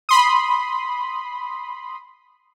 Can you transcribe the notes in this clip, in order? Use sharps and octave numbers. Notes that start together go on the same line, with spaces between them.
B5 C6 D#6